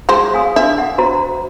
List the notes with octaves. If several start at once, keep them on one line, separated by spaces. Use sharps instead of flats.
F#3 G#3 C5
F5 G#5 D#6
D4 E5
F#5
F#4 C5 A#5